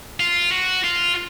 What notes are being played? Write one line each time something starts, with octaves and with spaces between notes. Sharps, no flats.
F4
F#4
F4